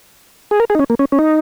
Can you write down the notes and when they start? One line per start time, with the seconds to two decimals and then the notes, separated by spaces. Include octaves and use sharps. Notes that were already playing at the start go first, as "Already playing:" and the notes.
0.51 G#4
0.60 A#4
0.70 G#4
0.75 D#4
0.79 C#4
0.90 A#3
0.99 C#4
1.12 C#4
1.19 D#4